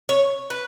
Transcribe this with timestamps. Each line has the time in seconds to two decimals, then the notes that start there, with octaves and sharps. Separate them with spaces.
0.09 C#5
0.50 B4